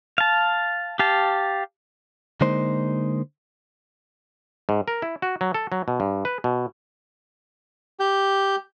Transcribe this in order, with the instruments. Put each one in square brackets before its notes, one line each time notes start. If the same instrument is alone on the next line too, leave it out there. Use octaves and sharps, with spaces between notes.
[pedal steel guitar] F5 A5
G4 F5 A5
[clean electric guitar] D3 G#3 A#3 D#4 C5
[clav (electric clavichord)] G#2
A#4
E4
F#4
F#3
A4
F#3
B2
G2
B4
B2
[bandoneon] G4 G6